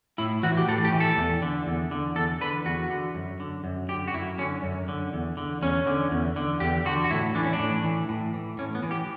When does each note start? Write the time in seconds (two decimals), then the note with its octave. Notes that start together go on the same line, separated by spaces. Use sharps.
0.18 A2 E4
0.43 E3 F#4
0.57 G4
0.68 A2 A4
0.85 G4
0.92 E3
1.00 A4
1.17 E2
1.42 D3
1.67 E2
1.91 D3
2.16 E2 A4
2.41 D3 B4
2.65 E2 F#4
2.90 D3
3.15 F#2
3.40 D3
3.64 F#2
3.89 D3 G4
4.08 F#4
4.14 F#2 E4
4.38 D3 C#4
4.63 F#2
4.88 D3
5.13 E2
5.37 D3
5.62 E2 C#4
5.87 D3
6.11 E2
6.36 D3
6.60 E2 G4
6.85 D3 F#4
7.04 F#4
7.11 A2 E4
7.35 E3 D4
7.44 C#4
7.53 D4
7.59 A2
7.84 E3
8.09 A2
8.34 E3
8.58 A2 C#4
8.75 B3
8.83 E3
8.91 G4